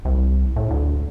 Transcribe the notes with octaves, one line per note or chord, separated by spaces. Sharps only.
C2
A2
D2